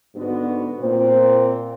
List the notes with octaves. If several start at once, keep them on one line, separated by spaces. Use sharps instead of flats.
G#2 D3 B3 F#4
A#2 C4